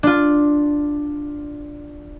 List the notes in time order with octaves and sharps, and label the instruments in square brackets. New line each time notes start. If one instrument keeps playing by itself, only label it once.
[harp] D4 F4